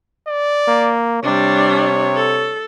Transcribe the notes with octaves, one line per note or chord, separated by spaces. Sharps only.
D5
A#3
C3 G3 D4 C#5
A4